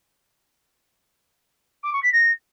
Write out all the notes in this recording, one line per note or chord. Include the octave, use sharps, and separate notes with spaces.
D6
C#6
B6
A#6